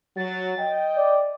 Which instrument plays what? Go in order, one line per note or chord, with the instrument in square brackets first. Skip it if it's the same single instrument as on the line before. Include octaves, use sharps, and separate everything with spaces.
[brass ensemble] F#3 [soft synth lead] A6
[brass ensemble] D#5 G5
[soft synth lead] D5